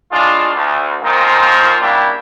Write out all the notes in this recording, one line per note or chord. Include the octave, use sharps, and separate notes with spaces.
A2 G#3 D4 F4
D2
F2 A#2 D#3 F3 A#4 C5
C#3 G3 A#3 D4 E4 G4